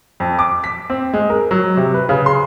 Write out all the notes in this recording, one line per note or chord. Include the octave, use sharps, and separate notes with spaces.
F2
D6
B6
C4
G#3
A#4
F#3
C3
B4
C#3
C6